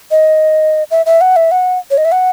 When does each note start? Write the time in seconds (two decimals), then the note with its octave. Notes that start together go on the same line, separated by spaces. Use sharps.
0.11 D#5
0.91 E5
1.06 E5
1.21 F#5
1.36 E5
1.51 F#5
1.91 C#5
1.98 D#5
2.05 E5
2.12 F#5